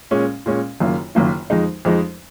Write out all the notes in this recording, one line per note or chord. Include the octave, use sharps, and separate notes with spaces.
A#2 G#3 C#4
A#2 G#3 C#4
F#1 F#2 D#3 A#3 F4
F#1 F#2 D#3 A#3 F4
F2 F3 G#3 D#4
F2 F3 G#3 D#4